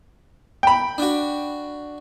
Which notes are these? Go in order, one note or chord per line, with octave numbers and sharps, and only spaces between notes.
G5 B5
D4 F#4